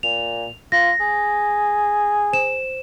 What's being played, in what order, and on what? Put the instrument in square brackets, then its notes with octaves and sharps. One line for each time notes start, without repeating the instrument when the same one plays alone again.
[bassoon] A#2 [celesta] F7
[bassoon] F4 [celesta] A#6
[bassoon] G#4
[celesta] C5 E7